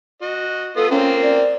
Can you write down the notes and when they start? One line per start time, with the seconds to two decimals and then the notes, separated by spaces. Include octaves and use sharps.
0.22 F#4 D#5
0.76 B3 F4 A4 D#6
0.91 A#3 C4 C#4 F4
1.22 D5